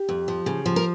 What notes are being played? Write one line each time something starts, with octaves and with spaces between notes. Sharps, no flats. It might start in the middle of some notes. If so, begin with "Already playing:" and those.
Already playing: G4
F2
F3
C#3
F3
A#4